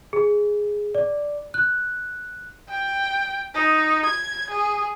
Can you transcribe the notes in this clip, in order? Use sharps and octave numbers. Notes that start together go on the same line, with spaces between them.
G#4
D5
F#6
G5
D#4
G#6
G#4